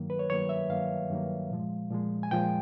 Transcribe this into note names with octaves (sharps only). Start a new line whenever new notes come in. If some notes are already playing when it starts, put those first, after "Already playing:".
Already playing: G2 D#3 F#3 A#3
B4
C#5
G2 D#3 F#3 A#3 C#5
E5
G2 D#3 F#3 A#3 F5
G2 D#3 F#3 A#3
A#2 F3 G#3
A#2 F3 G#3
G#5
A#2 F3 G#3 G5